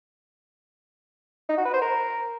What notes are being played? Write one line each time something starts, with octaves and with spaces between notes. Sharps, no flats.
D#4
F#4
B4
C5
A#4